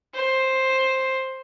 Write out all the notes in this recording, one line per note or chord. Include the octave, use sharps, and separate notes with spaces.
C5